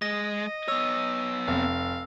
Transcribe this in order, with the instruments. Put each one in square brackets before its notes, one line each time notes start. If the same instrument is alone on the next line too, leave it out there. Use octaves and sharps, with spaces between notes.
[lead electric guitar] G#3 [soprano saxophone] D#5 [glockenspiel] A#6
[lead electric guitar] B3 C#5 [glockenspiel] E6
[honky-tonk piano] F1 [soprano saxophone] F5